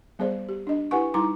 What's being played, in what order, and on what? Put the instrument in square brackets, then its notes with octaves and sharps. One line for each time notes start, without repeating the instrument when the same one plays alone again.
[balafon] G3 B3 G#4 C5 D5
G4
D4 D#5
E4 G4 B4 F#5 G#5 C#6
G3 D#4 E4 A#5 C6 D6